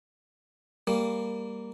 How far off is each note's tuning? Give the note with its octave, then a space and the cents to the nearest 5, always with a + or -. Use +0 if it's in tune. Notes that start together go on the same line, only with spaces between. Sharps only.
G3 +10 A#3 -5